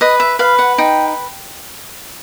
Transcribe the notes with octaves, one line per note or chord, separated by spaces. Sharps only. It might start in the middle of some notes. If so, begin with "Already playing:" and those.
B4 D#5
E5
B4 F5
F#5
D#4 G5